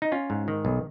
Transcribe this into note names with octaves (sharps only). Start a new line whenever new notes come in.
D#4
C#4 F4
G#2
D#3
B1